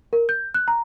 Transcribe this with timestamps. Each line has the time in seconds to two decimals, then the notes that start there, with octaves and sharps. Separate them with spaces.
0.13 A#4
0.29 G6
0.54 F#6
0.68 A#5